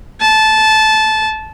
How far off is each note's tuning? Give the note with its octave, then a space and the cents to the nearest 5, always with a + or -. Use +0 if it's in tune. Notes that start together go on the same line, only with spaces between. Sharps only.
A5 -15